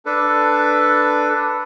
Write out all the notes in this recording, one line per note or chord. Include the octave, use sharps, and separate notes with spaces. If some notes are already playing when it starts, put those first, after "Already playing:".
D4 A4 B4